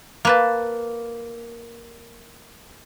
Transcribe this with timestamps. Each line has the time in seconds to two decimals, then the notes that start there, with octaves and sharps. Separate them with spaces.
0.25 A#3 B4 A5